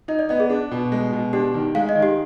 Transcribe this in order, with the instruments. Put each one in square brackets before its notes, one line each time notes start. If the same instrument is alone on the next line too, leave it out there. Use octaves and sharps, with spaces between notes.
[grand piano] D#4 [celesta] D#5
[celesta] D5
[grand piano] B3 [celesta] D#5
[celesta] G#4
[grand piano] D4
B2
G#3
B2
[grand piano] D4 [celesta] G4
[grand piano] D#3
[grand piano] G#3 [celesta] F5
[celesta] D#5
[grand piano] D#3
[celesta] G4